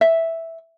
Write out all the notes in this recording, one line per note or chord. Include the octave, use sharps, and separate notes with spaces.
E5